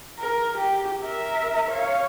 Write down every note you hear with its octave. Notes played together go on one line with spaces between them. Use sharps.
A#4
G4
A#4 E5
C#5 F5